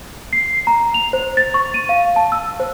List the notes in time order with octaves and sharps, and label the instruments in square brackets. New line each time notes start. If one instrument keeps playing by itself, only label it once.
[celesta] C7
A#5
F7
C5
A6
C#6
D#7
F5
A5
E6
C5